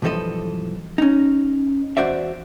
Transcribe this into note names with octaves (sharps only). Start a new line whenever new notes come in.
B1 G2 E3 F3 A4 D#5
C#4 D#4
E2 F#4 C5 D5 E5